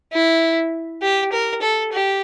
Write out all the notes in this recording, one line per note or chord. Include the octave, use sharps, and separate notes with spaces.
E4
G4
A#4
A4
G4